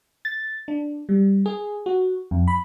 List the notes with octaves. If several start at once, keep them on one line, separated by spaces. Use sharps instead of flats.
A6
D4
G3
G#4
F#4
F2
B5